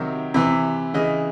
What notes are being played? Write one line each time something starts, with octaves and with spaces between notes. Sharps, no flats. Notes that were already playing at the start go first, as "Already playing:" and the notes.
Already playing: C3 D#3 F#3 E5
C3 E3
C#3 E3 D#5